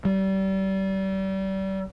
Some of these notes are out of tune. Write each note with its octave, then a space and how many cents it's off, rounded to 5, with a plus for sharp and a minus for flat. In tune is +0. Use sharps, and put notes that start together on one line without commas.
G3 -30